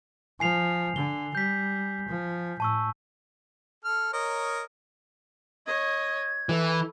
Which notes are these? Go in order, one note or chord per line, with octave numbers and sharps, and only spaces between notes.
F3 G#5 C7 F7
D3 G7
G3 G6 B6
F3
A2 A5 C#6 E6
A4 F6
A#4 C#5 D#5
C#5 D#5 G#6
E3 A4